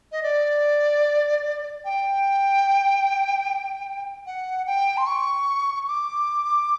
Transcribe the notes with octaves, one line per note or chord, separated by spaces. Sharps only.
D#5
D5
G5
F#5
G5
C6
C#6
D6